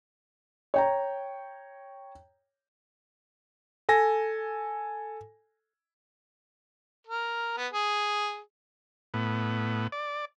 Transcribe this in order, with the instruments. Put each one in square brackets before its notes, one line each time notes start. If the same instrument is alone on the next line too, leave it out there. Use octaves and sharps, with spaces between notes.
[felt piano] C#5 G5 A#5
[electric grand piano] A4 G#5 A#6
[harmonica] A#4
B3
G#4
[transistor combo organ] A2 B3
D5